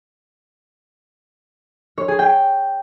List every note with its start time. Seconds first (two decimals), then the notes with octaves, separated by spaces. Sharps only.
1.98 C#5
2.08 G#4
2.19 G5